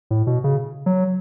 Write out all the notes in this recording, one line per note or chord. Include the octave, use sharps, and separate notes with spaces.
A2
B2
C#3
F#3